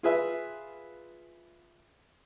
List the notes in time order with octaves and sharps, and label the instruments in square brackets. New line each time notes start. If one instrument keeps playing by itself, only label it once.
[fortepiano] F4 G#4 B4 E5